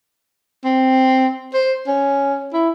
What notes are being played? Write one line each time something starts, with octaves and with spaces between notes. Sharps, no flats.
C4
C5
C#4
E4